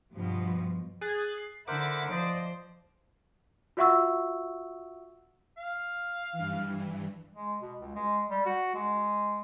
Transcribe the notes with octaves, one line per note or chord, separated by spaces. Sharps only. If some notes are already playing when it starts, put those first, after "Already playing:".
G2 B2 F3
G#4 F#6 A6
C7
D3 E4 A#4 C5 F#5 D6
F3 C5 D5 D#5
F4 F#4 E5 F#5 C#6 E6
F5
G2 E3
G#3
B2
C#2
G#3
G3
F#4
G#3